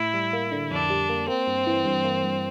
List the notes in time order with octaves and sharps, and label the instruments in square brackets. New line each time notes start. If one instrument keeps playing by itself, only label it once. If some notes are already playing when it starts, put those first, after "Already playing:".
Already playing: [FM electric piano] A2 [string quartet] E4
[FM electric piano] G3
A#3
D3
[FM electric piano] F2 [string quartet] D4
[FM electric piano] G3
A#3
[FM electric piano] A#3 [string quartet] C4
[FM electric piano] G2
E3
G2
A#3
G2